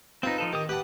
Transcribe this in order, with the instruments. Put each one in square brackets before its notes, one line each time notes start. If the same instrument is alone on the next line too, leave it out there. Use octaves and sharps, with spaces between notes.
[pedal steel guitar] C4 D#4 [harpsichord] F4 B4
[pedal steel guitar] F3 D#4 A4
[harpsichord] D#3 [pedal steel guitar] G4 D#6
[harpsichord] G4 F#5 A5 [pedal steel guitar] B4